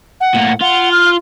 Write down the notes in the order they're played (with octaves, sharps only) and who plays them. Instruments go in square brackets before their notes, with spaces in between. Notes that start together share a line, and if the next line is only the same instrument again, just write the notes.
[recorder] F#5
[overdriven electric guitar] A2 A#3
[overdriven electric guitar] F4 [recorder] F#5
[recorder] F6